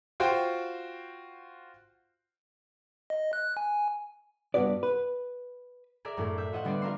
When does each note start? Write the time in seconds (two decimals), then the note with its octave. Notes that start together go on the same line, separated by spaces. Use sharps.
0.20 F4 F#4 C5 G5
3.10 D#5
3.33 F#6
3.57 G#5
4.54 G2 D#3 B3 F#4 B4 D5
4.83 B4
6.05 G#4 A#4 D5 E5
6.17 F#2 A2 A3 E4
6.38 E5 G6 B6
6.52 F4 F#4 C5 D#5 E5 F#5
6.64 D3 G3 B3 C4 C5 D5
6.82 D4 F4 A#4 E5 C6